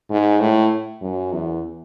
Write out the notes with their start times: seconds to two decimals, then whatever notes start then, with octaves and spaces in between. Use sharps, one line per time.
0.10 G#2
0.40 A2
1.02 F#2
1.33 E2